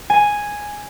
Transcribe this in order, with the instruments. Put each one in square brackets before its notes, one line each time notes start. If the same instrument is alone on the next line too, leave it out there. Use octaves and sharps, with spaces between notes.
[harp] G#5